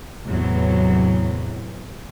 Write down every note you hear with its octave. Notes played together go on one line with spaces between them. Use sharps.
E2 A2 C3 E3 F#3